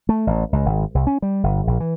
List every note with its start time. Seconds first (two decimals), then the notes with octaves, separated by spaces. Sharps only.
0.09 A3
0.27 A1
0.53 C#2
0.66 G#1
0.95 C2
1.07 C#4
1.22 G3
1.43 G1
1.67 A#1
1.80 E3